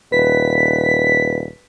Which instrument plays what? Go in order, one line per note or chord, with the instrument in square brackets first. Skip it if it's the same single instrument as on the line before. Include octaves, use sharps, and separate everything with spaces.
[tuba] D#1 [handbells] B4 [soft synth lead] B6